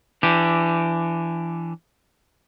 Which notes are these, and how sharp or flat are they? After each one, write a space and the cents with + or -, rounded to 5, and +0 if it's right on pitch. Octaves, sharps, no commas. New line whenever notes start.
E3 +25 D4 +0 G4 +0